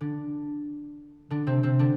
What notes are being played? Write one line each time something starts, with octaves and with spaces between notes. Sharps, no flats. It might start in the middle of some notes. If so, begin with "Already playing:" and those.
D3 D4
D3 D4
C3 C4
C3 C4
D3 D4